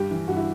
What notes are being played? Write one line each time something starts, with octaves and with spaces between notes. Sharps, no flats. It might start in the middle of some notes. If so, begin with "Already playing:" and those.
Already playing: G2 G4
E3
G2 F#4
E4